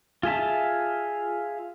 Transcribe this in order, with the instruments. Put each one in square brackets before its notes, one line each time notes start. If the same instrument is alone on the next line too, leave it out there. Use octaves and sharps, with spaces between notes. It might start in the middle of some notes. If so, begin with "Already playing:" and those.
[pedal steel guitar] F4 G#4 E5 A5